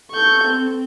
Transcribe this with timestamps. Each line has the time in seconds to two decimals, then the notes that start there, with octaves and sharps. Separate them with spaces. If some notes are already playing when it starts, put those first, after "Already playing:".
0.11 A4 C#6 G6
0.44 C4